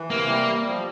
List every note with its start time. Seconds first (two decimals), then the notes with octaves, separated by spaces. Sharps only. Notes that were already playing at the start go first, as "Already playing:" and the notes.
Already playing: E3
0.10 C3 A#3
0.29 G3
0.47 G3
0.65 F3